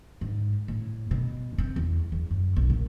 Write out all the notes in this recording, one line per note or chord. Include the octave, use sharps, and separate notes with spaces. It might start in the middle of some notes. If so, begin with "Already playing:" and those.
G#2
A2
B2
C4
E2
E2
F#2
B1
A#2